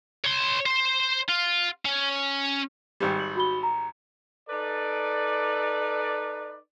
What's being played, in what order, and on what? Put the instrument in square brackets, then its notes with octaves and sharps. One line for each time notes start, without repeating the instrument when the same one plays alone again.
[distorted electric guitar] C#5 C6
C5
F4
C#4
[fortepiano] G#1 G3
[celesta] F#7
F#4 B5 G7
A#5
[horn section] D#4 A4 B4 D5